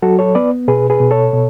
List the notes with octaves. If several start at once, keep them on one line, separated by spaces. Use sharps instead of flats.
F#3 F#4 A4
A4 C#5
B3 B4 D5
B2 G#4 B4
G#4 B4
B2
A4 C#5
B2